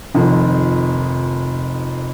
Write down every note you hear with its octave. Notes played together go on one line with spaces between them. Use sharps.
F1 F2 D#3